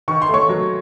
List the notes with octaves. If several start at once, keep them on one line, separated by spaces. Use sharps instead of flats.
D#3 C#6
C6
A3 C#5 C#6
F#3